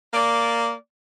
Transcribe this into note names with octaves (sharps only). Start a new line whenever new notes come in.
A#3 D5